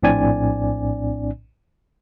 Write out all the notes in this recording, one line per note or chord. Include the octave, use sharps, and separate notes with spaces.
A#1 A2 C4 D4 D5 G#5